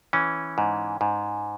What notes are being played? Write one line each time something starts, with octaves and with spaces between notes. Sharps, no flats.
E3 C#4
G#2
G#2